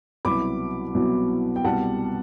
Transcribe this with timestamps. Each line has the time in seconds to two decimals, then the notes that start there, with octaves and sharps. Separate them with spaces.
0.25 C2 B2 F#3 B3 E4 B5 D6
0.95 C2 B2 F#3 B3 E4
1.56 G5
1.64 C2 B2 G3 F#5 A5